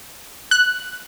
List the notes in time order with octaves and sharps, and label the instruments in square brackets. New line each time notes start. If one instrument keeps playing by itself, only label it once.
[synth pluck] F#6